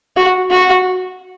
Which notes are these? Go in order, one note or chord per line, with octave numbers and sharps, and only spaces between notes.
F#4
F#4